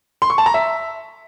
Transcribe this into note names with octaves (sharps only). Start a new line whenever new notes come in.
C6
C#6
A5
A#5
E5